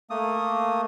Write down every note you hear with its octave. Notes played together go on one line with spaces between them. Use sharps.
A3 A#3 D#6